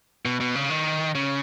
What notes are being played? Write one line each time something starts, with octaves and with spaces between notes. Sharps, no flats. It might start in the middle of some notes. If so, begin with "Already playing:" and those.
B2
B2
C#3
D#3
C#3